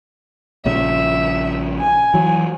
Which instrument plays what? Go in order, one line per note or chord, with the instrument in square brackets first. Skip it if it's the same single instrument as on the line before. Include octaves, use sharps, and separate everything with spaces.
[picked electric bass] A#1 A#2 C#3 [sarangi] E5
[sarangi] G#5
[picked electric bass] E3 F#3